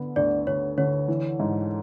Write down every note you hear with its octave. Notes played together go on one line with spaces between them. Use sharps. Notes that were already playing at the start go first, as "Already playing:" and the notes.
Already playing: D3 B3
D2 D5
D2 C#5
D3 C#5
E3
G#2